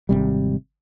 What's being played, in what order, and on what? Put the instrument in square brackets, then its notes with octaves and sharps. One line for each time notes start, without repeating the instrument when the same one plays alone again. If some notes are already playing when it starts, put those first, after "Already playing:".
[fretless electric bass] G#1 D#2 C3 G3